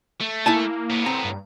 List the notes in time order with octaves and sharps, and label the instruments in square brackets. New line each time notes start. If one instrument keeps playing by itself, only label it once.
[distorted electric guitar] A3
[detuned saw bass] A#3 [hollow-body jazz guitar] E4 G#5 A5
[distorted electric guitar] A2 B3
[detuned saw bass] C4 [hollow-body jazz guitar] A#5
[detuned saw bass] G2